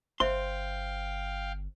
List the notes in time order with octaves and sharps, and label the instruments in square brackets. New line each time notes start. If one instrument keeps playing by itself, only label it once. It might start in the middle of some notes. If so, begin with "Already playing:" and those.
[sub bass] G1 [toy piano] C5 E5 [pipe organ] F5 G5 [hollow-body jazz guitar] C6